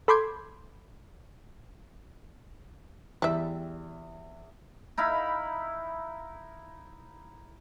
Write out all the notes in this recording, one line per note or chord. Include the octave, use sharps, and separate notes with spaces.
A4 B5 C6 D6 G6 G#6
E2 G3 E5
D#4 E4 F5 B5